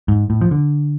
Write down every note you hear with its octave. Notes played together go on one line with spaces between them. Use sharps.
G#2
A2
F3
D3